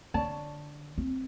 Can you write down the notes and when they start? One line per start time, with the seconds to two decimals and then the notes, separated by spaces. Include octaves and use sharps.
0.14 D3 C#5 D5 A5
0.98 C4